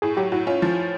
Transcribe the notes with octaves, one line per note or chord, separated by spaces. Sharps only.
A2 G#4
F#3 G4
A2 F#4
C#4 F4
F3